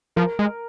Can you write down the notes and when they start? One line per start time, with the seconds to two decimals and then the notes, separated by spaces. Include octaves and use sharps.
0.16 F3 A#4
0.39 G#3